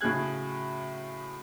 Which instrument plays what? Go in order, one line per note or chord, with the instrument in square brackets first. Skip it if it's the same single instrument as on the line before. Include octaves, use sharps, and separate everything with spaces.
[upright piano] A2 C#3 F#3 G#4 F#6 G#6